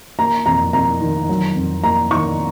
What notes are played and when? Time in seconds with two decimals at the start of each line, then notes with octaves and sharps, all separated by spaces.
0.19 A#3 A#5
0.46 F2 A#5
0.73 F2 A#5
1.01 D#3
1.29 F#3
1.56 F2
1.83 A#3 A#5
2.10 D#3 C#6